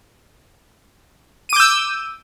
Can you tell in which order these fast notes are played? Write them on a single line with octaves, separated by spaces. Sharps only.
D#7 D6 G6 E6